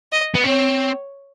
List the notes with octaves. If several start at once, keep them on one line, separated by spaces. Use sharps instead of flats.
D#5
B3
C4 C#5